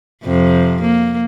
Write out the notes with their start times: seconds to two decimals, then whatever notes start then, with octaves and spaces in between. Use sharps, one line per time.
0.23 F2 C3
0.81 A#3